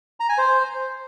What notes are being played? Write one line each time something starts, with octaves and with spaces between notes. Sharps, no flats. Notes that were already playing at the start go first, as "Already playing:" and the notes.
A#5
G#5
C5